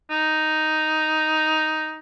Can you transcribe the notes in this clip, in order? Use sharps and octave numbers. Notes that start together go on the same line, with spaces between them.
D#4